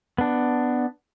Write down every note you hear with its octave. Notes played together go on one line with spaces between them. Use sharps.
B3 D4